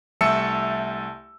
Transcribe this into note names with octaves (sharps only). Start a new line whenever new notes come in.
C2 A3 E5 A5 E6 C#7